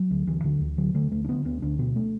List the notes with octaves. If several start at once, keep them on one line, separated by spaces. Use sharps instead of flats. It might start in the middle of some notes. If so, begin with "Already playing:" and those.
Already playing: F#3
D2
D2 E3
D2 D3
D2
D3 F#3
D3 A3
D2 A3
D4
D3 B3
D2 B3
D2 D4
B2 B3
A3